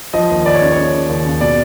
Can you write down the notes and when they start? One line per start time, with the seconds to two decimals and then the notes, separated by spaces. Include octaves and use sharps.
0.13 F3 D#5
0.30 D#2
0.45 D#2 D5
0.54 C#5
0.61 C#3
0.72 C#5
0.77 C#3
0.94 C#3
1.09 D#2
1.25 C#3
1.41 B2 D5